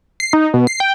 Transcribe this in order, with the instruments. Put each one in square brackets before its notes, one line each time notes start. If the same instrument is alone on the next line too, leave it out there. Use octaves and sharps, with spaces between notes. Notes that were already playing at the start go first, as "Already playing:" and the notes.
[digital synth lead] C7
D#4
B2
C7
G5